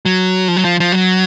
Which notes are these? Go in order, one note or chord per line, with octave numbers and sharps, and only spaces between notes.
F#3
F3
F#3
F3
F3
F#3